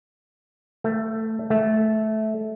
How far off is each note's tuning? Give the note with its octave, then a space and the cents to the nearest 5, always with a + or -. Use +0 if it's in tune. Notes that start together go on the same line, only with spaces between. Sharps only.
A3 +10
A3 -15